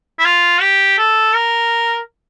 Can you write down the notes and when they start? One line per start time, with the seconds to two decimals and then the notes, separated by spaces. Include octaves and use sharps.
0.19 E4
0.25 F4
0.61 G4
0.98 A4
1.34 A#4